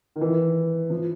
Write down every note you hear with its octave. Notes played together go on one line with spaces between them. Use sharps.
D#3
E3
F3